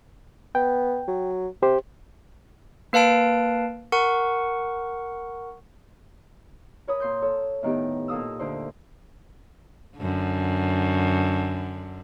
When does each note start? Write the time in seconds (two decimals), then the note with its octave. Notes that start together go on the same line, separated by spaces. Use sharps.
0.55 B3 G5
1.08 F#3
1.63 C3 G4 C5
2.93 A#3 B4 F5 A5 D7
3.92 A#4 F#5 C#6
6.87 A#4 C#5 B5 D#6
7.00 A#2 C6 G6
7.22 A4 C#5
7.63 A2 D#3 B3 G4
8.08 A#2 A4 F5 D#6 E6
8.39 D2 D3 C5
9.97 F#2 D3